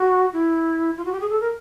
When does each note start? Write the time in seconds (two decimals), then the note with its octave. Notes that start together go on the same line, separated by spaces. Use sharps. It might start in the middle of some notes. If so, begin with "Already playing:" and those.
Already playing: F#4
0.33 E4
0.97 F4
1.05 F#4
1.12 G4
1.20 G#4
1.29 A4
1.40 A#4